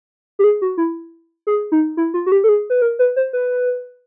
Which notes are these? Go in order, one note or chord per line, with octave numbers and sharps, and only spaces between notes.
G4
G#4
F#4
E4
G#4
D#4
E4
F4
F#4
G4
A4
G#4
B4
A#4
B4
C5
B4